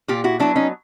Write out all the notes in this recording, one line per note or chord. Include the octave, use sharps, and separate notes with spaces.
A#2 F4 G4
E4 F#4
F#3 B3 D4 E4
C#4 D#4